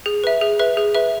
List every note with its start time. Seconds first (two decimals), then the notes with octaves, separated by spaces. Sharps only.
0.06 G#4
0.24 B4 E5
0.41 G#4
0.59 B4 E5
0.77 G#4
0.95 B4 E5